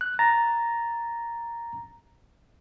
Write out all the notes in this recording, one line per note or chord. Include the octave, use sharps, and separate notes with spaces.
F#6
A#5 A6 A#6